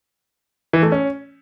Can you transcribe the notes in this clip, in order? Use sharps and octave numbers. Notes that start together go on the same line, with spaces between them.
E3
A3
C#4